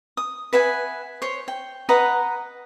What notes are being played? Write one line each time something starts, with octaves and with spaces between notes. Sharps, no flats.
D#6
B4 E5 F#5 G#5
C5 C#5
G5
B4 D#5 F#5 A#5